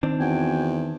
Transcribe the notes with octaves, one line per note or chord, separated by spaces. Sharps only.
D#3 C4 D4
E2 F#4 G5 G#5